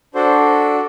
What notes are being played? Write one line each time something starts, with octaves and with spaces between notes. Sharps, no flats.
D4 F#4 A4 C5